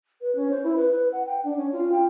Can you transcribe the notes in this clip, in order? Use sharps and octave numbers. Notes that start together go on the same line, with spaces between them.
B4
C#4
C5
E4
B4
B4
F#5
G5
D4
C#4
F4
G5